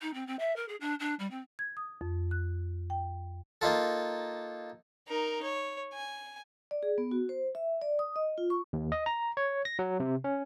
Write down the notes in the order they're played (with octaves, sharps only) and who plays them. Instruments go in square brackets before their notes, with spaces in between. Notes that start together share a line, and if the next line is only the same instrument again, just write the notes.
[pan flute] D#4
C4
C4
E5
A#4
G#4
D4
D4
G3
C4
[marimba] G#6
D#6
F2
F#6
G5
[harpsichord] A#3 D#4 F4 A4
[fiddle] D#4 A#4
C#5
G#5
[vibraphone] D5
G#4
B3
F#4
C5
E5
D5
D#6
D#5
F4
C#6
[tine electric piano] D#2
D#5
A#5
C#5
A#6
F#3
C3
C#4